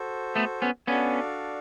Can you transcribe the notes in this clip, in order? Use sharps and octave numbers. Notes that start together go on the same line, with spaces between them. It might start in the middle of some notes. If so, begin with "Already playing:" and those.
Already playing: F#4 A4 C5
A3 B3
B3 C#4
B3 C#4 D4 F#4 A4 D5 F5